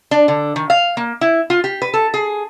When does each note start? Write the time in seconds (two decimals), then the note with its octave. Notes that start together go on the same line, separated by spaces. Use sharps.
0.11 D4
0.28 D3
0.56 D#3
0.70 F5
0.97 A#3
1.21 E4
1.50 F4
1.64 G4
1.82 B4
1.94 A4
2.14 G#4